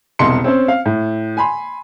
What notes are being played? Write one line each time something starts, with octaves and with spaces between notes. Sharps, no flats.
E1 C2 D#5 C6 C#7
C4 C#4 C5
F5
A2
G#5 B5 C6